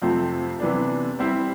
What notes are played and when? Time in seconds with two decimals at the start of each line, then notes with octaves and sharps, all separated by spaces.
0.02 F2 C3 F3 A3 C4
0.59 C3 E3 B3 D4
1.19 G3 C4 E4